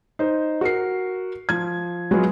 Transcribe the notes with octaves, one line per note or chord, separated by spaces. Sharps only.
D#4 C5
F#4 A#4 C7
F3 G#6
F#3 G#3 B3 F4 F#4